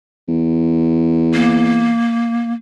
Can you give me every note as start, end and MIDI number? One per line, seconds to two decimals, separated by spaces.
0.28 1.97 40
1.34 2.53 58